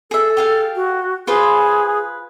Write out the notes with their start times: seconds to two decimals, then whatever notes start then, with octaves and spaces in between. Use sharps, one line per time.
0.11 G#4 A4 E5
0.37 G4 G#4 F5
0.76 F#4
1.27 F4 G#4 B4 C5